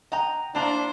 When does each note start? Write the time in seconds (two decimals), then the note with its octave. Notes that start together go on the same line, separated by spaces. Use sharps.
0.12 D#5 F#5 G5 A#5
0.55 A#3 D4 E4 C5 F#5 A5 A#5